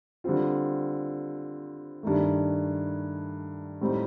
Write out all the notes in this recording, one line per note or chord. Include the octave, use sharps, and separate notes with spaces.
D3 G3 C4 F4
G2 D#3 A3
A2 G3 C4 D#4